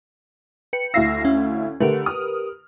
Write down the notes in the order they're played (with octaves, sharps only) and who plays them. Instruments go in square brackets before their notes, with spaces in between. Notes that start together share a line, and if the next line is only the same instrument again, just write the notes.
[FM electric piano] B4 G5 C#7
[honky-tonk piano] D2 E4 F5 [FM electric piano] E6 A#6 C7
[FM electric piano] C#4
[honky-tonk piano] D3 A3 [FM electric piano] G4 A#4 B4
[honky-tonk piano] D#6 F6